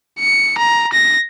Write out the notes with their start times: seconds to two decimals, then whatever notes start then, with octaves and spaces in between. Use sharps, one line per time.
0.20 C#7
0.58 A#5
0.93 A#6